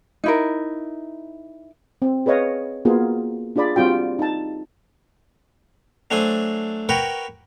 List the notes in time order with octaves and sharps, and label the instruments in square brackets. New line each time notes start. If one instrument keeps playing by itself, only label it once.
[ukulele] D#4 E4 A#4
[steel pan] C4
G#4 B4 C#5 D#5 F5
A#3 B3 F4 F#4 G#4 A#4
D4 F4 G#4 D5 B5
G3 C4 F4 F#4 G5
D#4 A5
[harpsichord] F#3 A3 D4 C5 G#5
F#4 A#4 B4 C#5 G5 B5